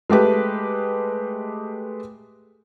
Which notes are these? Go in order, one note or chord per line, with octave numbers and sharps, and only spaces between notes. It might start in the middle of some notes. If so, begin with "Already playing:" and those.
G#3 A3 G4 B4